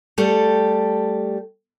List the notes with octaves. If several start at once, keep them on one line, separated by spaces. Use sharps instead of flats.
G3 A3 G4 A4